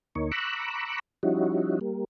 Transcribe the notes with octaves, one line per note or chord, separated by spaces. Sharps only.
D2 A#3 D#4 C#5
A#5 B5 C#6 D6 E6 F#6
F3 G3 C#4 D#4 E4 F#4
G3 A#3